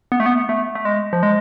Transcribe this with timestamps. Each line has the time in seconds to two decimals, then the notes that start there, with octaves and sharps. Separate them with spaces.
0.12 B3
0.20 A3
0.26 B3
0.49 A3
0.75 A3
0.85 G#3
1.13 F3
1.23 G#3